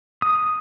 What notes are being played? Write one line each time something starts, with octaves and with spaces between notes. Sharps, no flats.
D#6